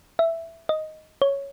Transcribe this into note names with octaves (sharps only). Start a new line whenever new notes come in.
E5
D#5
C#5